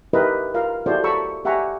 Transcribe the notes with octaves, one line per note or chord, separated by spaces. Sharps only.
D#4 E4 G4 A#4 B4 D#5
F4 A#4 F5
E4 F#4 G4 A4 C5 D5
F#4 A4 A#5 B5 C#6 E6
G4 E5 F#5 G#5 A#5 C#6